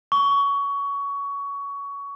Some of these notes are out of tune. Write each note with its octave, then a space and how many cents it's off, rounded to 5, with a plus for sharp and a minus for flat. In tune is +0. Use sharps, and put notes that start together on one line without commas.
C#6 +20